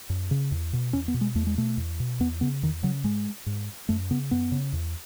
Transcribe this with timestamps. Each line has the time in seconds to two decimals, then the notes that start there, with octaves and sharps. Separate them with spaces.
0.10 F#2
0.31 C#3
0.52 E2
0.73 B2
0.93 E2 C#4
1.08 B3
1.14 B2
1.21 G#3
1.35 E2 A3
1.47 G#3
1.57 B2 A3
1.77 E2
2.00 B2
2.20 E2 B3
2.41 C#3 B3
2.63 E2 D#3
2.83 C#3 F#3
3.04 G#2 G#3
3.46 G#2
3.89 F#2 A3
4.11 C#3 B3
4.31 F#2 B3
4.52 C#3
4.73 E2